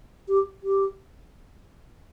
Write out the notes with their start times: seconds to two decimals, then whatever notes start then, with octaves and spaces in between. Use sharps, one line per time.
0.28 G4
0.63 G4